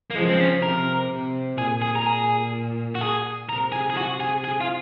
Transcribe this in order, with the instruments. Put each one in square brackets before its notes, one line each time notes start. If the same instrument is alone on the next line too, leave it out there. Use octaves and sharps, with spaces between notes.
[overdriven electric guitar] A#3
[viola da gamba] C#3 F3 [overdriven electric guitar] G#3
[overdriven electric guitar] C4
C#4
[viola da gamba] C3 [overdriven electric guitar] A#4
[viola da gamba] C3
[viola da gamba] A#2 [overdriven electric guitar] G#4
[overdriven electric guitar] G#4
A#4
G#4
F#4
G#4
[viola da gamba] C3 [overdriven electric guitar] A#4
[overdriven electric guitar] G#4
G#4
F#4
G#4
G#4
F4